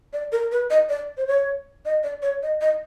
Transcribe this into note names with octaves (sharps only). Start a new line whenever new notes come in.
D5
A#4
B4
D#5
D5
C5
C#5
D#5
D5
C#5
D#5
D#5